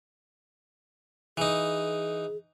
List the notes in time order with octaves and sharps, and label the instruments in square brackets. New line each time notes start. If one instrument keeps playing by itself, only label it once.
[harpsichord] E3 D#4 [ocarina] G#4